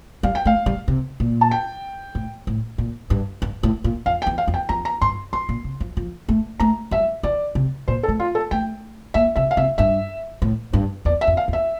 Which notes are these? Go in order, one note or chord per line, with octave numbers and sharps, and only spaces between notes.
G3 F5
G5
A3 F5
G3
C3
A#2
A5
G5
A2
A2
A#2
G2
G2
A2
A#2
F2 F5
G5
E2
F5
F2
G5
F2 A#5
A#5
G2 C6
G2 C6
A#2
C3
F3
F3
A3
A3 A#5
G3 E5
E3 D5
C3
A#2 C5
A4
A3
F4
A4
A3 G5
A#3 E5
C3 E5
F5
C3 E5
G2 E5
A2
G2
E2 D5
E5
F2
F5
E2
E5